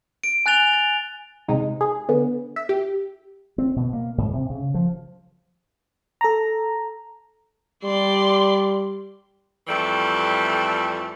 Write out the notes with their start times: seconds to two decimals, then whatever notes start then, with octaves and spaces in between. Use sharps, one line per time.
0.24 D7
0.46 G#5 F#6 A6 F7 G7
0.73 A6
1.48 C3 G#3 D#4
1.81 G#4
2.09 D3 B3
2.56 E5
2.69 G4
3.58 C4
3.76 B2
3.93 A#3
4.18 G#2
4.33 C3
4.50 C#3
4.74 F3
6.21 A4 A#5
7.84 G3 D5 C6
9.67 F2 E3 G3 A3